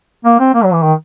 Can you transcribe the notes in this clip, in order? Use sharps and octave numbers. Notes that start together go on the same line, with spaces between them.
A#3
C4
A#3
F#3
E3
D#3